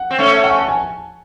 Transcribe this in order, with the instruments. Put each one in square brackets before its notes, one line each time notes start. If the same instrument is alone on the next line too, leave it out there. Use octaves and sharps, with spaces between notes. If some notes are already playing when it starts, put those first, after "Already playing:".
Already playing: [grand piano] F#5
[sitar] C4
A3 C#4
[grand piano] F#5
G#5
A5
G#5